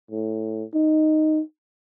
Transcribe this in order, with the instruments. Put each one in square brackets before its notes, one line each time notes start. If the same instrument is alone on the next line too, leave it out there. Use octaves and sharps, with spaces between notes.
[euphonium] A2
D#4